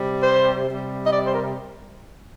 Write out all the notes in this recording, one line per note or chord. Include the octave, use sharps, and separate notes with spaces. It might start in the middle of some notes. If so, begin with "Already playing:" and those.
Already playing: C3 G3
C5
C3 G3
D#5
D5
C5
A#4